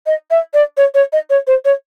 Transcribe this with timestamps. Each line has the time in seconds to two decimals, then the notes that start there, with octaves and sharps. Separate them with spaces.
0.06 D#5
0.31 E5
0.54 D5
0.77 C#5
0.94 C#5
1.12 D#5
1.30 C#5
1.47 C5
1.65 C#5